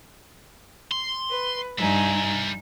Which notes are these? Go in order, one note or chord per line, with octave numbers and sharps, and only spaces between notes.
C6
B4
G2 G3 D#4 E5 G#5